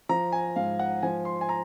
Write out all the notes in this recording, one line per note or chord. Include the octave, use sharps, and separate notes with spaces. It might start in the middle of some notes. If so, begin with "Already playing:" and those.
F3 A#5
G#5
G#2 F5
F#5
F3 G#5
C6
G#5
A#5